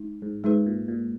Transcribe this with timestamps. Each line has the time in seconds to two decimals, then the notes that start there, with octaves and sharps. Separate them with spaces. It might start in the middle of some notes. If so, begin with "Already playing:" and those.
Already playing: G#3 D#4
0.22 G#2
0.44 G#2 G#3 D#4 G#4 B4
0.66 A#2
0.88 A#2